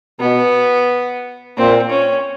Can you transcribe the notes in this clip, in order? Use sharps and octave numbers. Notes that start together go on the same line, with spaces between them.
B2 B3
A#2 C4
C#4